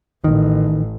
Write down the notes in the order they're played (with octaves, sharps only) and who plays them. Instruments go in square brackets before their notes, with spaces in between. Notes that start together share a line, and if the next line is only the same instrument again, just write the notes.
[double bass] A1 [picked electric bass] D#3